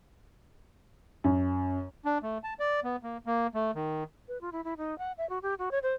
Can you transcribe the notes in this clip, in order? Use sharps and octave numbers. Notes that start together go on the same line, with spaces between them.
F#2
D4
A3
A5
D5
B3
A#3
A#3
A3
D#3
B4
F4
E4
E4
D#4
F#5
E5
F#4
G4
F#4
C#5
C5